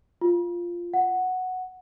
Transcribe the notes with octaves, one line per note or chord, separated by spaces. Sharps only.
F4
F#5